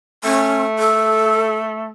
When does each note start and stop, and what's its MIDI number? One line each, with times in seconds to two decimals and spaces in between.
0.24 1.92 57
0.24 0.63 61
0.79 1.57 69